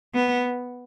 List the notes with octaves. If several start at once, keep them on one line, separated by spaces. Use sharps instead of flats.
B3